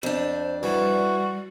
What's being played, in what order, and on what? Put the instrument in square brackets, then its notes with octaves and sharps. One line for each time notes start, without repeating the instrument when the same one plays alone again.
[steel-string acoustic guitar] F2 D4 [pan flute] C5
[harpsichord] E3 [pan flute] G3 [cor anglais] F#4